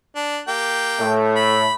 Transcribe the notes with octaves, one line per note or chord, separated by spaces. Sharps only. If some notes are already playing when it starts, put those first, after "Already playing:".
D4
A#3 G4 G5
A2 A3
B5